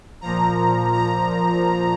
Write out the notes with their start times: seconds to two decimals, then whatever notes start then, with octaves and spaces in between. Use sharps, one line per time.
0.21 A#2 F3 A#5
0.93 A#5